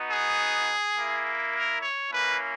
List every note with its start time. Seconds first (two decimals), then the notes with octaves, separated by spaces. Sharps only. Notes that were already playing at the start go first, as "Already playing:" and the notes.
Already playing: B3 D#4 F#4
0.11 G#4
0.96 A#3 E4
1.53 A#4
1.81 C#5
2.10 A#3 C#4 E4 B4